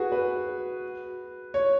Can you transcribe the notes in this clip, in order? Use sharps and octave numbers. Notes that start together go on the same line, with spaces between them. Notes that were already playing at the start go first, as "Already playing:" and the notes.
Already playing: F#4 G#4 B4
B4
C#5